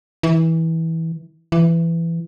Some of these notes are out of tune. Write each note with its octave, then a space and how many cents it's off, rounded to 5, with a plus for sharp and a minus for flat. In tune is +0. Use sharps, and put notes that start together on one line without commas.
E3 -20
E3 +15